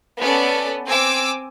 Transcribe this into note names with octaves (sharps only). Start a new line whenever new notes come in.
B3 C#4 A4 D5
C4 G#5 D6 E6